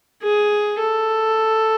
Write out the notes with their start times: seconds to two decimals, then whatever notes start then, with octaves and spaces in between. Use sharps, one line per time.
0.22 G#4
0.80 A4